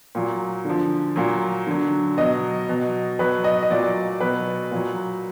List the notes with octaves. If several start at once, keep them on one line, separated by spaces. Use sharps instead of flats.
A#2 F#3
D3 F3
A#2 F#3
D3 F#3
B2 F#3 D#5
B2 F#3
B2 F#3 B4
D#5
D#5
A#2 F#3 D5
B2 F#3 B4
A#2 F#3